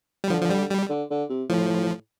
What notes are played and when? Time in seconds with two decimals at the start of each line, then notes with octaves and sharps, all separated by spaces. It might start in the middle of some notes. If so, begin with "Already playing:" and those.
0.24 G3
0.30 D3 F3
0.41 F3
0.50 G3
0.70 G3
0.89 D3
1.10 D3
1.30 C3
1.49 A2 F3